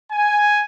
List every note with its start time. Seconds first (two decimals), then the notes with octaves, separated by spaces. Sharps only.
0.12 G#5